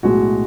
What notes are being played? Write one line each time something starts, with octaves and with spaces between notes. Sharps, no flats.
B1 A2 G#3 F#4